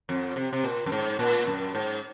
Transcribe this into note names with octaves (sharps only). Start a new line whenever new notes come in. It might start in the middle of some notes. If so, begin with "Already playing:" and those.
F2
C3
C3
A#2
F#2
G#2
A#2
F#2
G#2